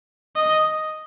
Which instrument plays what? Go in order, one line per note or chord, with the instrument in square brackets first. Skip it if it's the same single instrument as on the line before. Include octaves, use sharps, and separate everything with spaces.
[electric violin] D#5